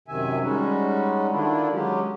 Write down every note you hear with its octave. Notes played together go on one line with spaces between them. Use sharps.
F#2 C3 D#3 E5 G#5
G3 G#3 C#4 D#4 F#4
D3 D#3 D4 E4 F4
F#3 G#3 C#4 G4